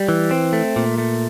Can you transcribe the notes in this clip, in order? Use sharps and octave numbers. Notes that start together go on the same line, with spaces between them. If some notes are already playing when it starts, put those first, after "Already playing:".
Already playing: G3
E3
C4
A3
A#2
A3